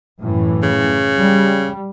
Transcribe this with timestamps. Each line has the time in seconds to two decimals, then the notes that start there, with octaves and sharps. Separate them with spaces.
0.22 F#2 A2 E3
0.63 C#3
1.19 G3